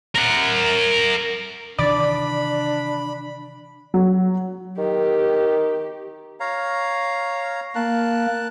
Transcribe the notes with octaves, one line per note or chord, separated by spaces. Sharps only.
A#4 F#5
C3 D#3 E3 D4 D5 B5
F#3
D#3 G4
C#5 F5 A#5
A#3 A#4 A5 F#6